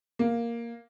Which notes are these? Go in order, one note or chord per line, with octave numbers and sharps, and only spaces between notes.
A#3